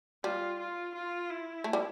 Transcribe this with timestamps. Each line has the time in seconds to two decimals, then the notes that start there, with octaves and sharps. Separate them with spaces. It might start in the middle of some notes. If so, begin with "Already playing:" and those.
0.24 G3 F4
0.60 F4
0.95 F4
1.30 E4
1.64 A3
1.73 G3